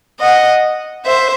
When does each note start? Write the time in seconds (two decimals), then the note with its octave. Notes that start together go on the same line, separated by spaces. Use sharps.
0.20 D#5 F#5
1.05 C5 E5